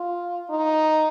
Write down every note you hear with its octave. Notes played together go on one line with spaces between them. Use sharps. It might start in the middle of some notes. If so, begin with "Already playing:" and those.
Already playing: F4
D#4